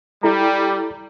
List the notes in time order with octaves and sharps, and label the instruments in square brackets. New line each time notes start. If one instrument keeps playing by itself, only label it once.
[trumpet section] G3 [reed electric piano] E4 A4 A#5